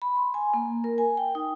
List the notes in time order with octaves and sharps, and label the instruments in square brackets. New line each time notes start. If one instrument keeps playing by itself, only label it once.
[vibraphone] B5
C6
G#5
A#3
A#4
G#5
G5
D#4